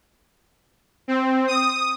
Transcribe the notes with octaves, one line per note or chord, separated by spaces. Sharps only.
C4
D#6